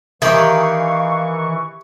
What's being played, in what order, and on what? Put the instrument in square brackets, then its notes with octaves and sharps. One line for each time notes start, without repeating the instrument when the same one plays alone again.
[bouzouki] D#3 [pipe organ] E3 C#6 [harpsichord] G4 G#4 E5 [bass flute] F5